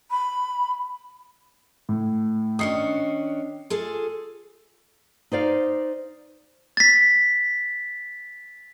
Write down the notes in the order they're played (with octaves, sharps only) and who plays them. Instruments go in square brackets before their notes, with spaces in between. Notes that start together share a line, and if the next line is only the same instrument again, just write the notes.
[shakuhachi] B5
[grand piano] A2
[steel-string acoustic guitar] D#3 C#4 D4 [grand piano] D#6 C7 C#7
[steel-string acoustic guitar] F4 G#4 A4
[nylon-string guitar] D#4 C5 D5 F5
[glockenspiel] A6 B6